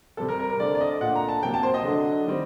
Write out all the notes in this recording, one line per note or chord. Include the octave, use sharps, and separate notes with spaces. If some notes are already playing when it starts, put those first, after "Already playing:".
C3 G3 C4 A4
A#4
A#4
A#4
D3 A3 C4 D5
D5
D#5
A#2 A3 D4 F#5
A#5
A5
C3 F#3 A#3 G5
A5
C5
D#5
D3 F#3 A3 D4
D#3 G3 C4